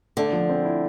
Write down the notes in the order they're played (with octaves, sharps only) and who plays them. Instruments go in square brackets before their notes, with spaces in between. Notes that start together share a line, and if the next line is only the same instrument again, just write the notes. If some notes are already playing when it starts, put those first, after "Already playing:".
[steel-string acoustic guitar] D3 [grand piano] A3
[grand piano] F3
C4
E4